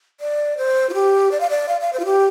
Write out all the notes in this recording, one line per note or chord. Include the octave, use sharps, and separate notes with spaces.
D5
C5
F4
G4
D5
F5
D5
F5
F5
C5
F4
G4